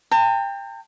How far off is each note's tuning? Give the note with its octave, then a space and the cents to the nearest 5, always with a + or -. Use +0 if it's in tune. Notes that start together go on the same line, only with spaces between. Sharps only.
G5 +25 A#5 -45